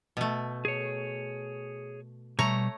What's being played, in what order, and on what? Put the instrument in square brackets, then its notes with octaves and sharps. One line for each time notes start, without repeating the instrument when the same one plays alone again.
[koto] B2 A3
[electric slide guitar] G#4 C#5
[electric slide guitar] B2 G3 [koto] A3 C#5 A#5